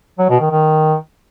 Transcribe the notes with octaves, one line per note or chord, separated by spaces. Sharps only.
F#3
B2
D#3
D#3